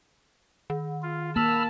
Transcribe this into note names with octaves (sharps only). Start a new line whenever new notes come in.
D#3
F4
A#3 A5 B5 E6 F6